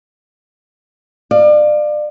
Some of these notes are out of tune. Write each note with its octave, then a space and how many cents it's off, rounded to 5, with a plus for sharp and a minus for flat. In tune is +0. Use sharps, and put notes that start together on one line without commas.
D5 +30 F5 +0